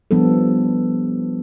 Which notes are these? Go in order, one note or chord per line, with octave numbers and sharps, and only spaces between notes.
F3 G3 B3 D4 A4